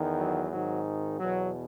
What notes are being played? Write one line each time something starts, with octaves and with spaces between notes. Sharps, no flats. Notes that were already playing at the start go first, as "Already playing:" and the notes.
Already playing: E2 D#3
F#3
G#1 G#2 D#3 F#3
E2 B2 F#3